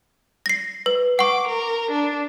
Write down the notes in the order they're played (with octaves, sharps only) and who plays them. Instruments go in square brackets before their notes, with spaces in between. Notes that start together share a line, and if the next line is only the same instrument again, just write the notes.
[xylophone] A#6 C7
B4
[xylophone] F#5 C#6 [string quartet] D6
[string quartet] A#4
D4